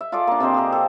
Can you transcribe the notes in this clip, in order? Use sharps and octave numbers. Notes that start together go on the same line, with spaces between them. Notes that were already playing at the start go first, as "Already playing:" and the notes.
E5
F4 G#4 A4 D5
A#3 D4
C3 C4 C5 D#5
G4 G#4 A#4
A4